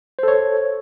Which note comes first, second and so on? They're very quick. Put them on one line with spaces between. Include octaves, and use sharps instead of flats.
C5 A4 C#5